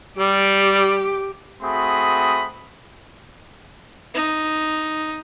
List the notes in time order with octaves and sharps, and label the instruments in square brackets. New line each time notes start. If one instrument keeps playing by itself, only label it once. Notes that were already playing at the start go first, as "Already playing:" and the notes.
[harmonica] G3 [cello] G4
[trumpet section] A3 C4 F#4 G#4 B5 D#6
[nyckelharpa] D#4